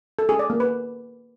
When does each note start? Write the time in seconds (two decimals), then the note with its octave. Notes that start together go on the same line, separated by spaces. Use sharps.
0.19 A4
0.29 G#4
0.39 D5
0.50 A#3
0.60 B4